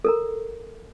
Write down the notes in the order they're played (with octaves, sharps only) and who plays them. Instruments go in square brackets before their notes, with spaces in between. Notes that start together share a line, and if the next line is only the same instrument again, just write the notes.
[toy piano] A4 A#4 A#5